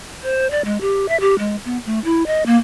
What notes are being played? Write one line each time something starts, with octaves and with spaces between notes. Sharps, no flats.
C5
D5
G#3
G4
E5
G4
G#3
B3
A3
E4
D#5
A#3